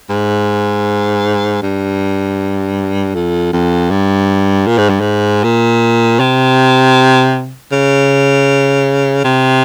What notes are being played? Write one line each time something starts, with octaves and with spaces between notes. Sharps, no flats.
G#2
G2
F2
F2
G2
A#2
G#2
G2
G#2
A#2
C3
C#3
C3